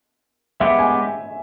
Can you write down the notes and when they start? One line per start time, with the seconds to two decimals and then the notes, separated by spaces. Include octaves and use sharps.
0.60 G#3 B3 G4 E5
0.79 G#5